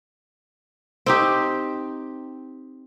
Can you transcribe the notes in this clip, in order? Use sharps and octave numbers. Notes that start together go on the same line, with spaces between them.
C4 D#4 G4